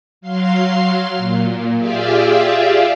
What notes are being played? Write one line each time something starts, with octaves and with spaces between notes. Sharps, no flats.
F#3 F5 C6 C7
A#2
F4 G4 G#4 D5 E5 F5